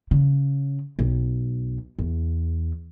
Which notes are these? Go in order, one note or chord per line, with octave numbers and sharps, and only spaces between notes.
C#3
B1
E2